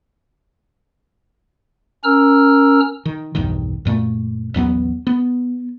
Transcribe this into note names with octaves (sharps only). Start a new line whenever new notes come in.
C#4 A#4 A#5 E6 F6
D#3
B1 E2 G2 D#3
F#2 A#2 A3
A1 D#2 F#3 B3
B3